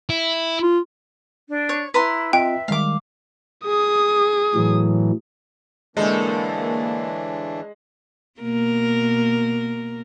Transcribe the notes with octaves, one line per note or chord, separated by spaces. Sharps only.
E4
F4
D4
C#5
E4 B4 A#5 C6
C4 F4 D#5 E5 G5
D#3 G3 G#3 F5 D6
G#4 D#6
A2 E3 F#3
A2 D3 E3 G#3 A#3 D4 A4
B2 A#3 A#4